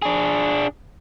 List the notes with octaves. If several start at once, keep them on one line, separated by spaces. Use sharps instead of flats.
D4 G#4